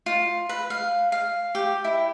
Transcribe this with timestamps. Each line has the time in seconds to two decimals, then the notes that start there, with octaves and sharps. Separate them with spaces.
0.06 F4
0.49 B4
0.70 F5
1.12 F5
1.55 G4
1.84 E4